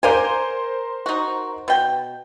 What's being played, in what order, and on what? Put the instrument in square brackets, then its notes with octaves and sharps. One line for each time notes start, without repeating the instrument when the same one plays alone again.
[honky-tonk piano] A#4 C5 G6 [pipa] D5 F5 G#5
[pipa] D#4 F#4
B2 G5